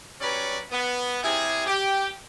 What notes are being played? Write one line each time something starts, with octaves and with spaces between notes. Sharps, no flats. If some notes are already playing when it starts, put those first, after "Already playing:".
F#3 G3 C#4 B4 C#5 D5
B3
C3 G3 E4 G#4
G4